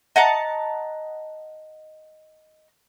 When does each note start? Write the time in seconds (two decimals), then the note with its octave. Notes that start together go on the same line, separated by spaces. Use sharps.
0.16 D#5 F#5 A5 A#5